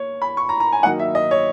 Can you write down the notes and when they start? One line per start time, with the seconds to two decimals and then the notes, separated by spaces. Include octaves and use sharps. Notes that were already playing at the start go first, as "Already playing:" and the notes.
Already playing: A#3 C#5
0.22 B5
0.37 C#6
0.49 A#5
0.60 A#5
0.72 G#5
0.83 D#3 F#3 A#3 D#4 F#5
0.99 E5
1.15 D#5
1.31 C#5